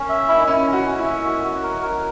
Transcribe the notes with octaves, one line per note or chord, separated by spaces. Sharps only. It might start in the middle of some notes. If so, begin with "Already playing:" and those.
Already playing: A#3 C#4
E5
E4
D#4
C#4 E4
C#4
F#4
C#4
E4
E5
F#4
F#4
A#4
A#4